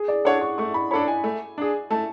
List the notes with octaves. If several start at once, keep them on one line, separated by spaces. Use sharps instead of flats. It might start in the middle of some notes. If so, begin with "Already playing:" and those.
Already playing: G#4
D5
D4 A4 C#5 F#5
C#6
A3 C#6
B5
D4 A4 C#5 B5
G#5
A3
D4 G#4
A3 A5